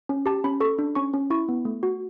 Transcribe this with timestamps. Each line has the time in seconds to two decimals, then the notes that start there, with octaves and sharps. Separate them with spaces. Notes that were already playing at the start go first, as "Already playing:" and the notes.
0.09 C#4
0.26 G4 A5
0.44 C#4 B5
0.60 A4 C#6
0.79 D4
0.95 C#4 C#6
1.13 C#4
1.30 E4 C#6
1.49 B3
1.65 A3
1.83 F#4